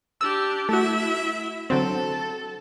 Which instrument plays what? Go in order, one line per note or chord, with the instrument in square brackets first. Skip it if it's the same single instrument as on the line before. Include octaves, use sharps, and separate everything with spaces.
[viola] D4 G4 [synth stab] E6
[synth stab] A3 F#4 [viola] E4 E5
[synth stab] D3 F#3 C4 [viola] A4